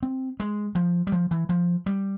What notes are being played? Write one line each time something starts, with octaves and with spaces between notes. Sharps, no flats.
C4
G#3
F3
G3
F3
E3
F3
G3